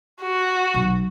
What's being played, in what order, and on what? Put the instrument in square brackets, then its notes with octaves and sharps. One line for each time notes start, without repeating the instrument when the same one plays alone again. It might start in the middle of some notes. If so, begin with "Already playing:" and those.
[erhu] F#4
[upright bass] B1